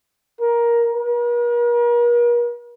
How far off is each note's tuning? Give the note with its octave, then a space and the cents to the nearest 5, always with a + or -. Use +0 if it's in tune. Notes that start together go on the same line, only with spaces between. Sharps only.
A#4 +15
A#4 +45